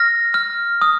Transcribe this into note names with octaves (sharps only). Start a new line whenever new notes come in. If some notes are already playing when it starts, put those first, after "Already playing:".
Already playing: F6 A#6
F6
D#6